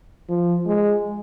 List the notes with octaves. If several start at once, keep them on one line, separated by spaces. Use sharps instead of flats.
F3
G#3